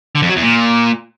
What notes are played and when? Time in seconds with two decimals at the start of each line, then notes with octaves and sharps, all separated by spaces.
0.15 D3
0.22 F2
0.29 F#3
0.36 E2
0.43 A#2